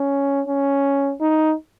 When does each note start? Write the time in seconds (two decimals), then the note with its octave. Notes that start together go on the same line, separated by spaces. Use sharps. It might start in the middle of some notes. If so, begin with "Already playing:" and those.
Already playing: C#4
0.47 C#4
1.21 D#4